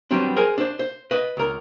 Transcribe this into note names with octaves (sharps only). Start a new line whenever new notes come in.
F#3 G3 B3 C4 D4
G#4 A#4 C5 G#5
D4 C5
C5
B4 D#5
C#2 A#4